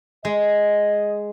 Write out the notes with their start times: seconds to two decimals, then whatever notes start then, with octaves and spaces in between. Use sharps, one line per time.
0.25 G#3 D#5